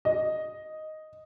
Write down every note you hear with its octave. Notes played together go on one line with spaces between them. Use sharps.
D#5